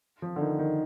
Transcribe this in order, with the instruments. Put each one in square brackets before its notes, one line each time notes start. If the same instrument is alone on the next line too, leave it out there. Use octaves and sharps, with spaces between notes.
[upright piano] F3
D3
D#3
D#3